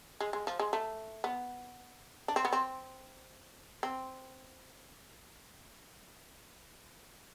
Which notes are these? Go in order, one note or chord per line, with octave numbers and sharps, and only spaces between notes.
G#3
G#3
F3
G#3
A3
B3
D4
C4
B3
C4
C4